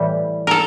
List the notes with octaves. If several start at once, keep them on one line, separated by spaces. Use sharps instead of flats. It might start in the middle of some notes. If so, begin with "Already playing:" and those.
Already playing: A2 E3 G3
A4 A#4